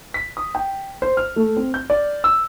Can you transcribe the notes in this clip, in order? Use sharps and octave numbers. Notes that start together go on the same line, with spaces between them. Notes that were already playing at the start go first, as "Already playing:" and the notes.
B6
D#6
G5
C5
F6
A3
C4
G6
D5
E6